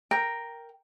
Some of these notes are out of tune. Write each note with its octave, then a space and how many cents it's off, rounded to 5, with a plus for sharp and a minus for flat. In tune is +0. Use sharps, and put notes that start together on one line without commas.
A#4 +0 G5 +0